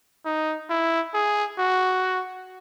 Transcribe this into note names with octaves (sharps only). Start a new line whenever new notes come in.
D#4
E4
G#4
F#4